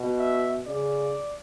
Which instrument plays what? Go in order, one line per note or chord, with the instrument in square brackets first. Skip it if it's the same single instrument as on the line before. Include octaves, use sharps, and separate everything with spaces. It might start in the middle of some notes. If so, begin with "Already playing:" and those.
Already playing: [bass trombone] B2
[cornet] E5
[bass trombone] C#3 [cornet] D5